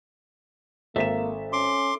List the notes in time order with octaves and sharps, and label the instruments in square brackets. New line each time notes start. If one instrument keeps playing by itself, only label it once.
[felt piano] G#1 B6 E7 [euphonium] A#3 [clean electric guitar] A4 E5
[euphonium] C#4 [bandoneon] C6 D6